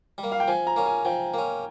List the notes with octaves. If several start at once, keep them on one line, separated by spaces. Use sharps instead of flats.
G3
A#3
F5
G5
F3 G#5
A#5
A#3 C#4
G#5
F3 G5
A#3 C#4